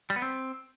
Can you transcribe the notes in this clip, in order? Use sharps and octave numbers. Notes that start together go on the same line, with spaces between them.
G3
B3
C4